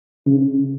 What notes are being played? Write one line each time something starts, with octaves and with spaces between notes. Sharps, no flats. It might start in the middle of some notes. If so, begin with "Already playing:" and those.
C#3